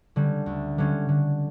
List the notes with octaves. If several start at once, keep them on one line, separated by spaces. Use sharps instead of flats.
D3 G3 C#4
D2
D3 G3 C#4
D3